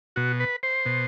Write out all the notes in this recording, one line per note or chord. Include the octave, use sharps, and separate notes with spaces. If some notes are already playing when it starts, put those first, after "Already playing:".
B2 F#4
B4
C5
B2